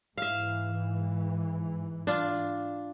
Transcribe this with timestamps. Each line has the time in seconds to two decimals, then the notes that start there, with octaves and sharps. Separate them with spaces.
0.17 G#2 E3 E5 F5
2.07 D4 F4